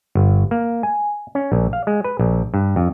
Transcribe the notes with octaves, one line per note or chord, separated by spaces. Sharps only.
G1
A#3
G#5
C#4
A#1
F5
G#3
B4
A#1
G2
F2